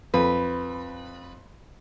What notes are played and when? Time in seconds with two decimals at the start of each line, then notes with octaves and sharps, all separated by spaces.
0.14 F2 B4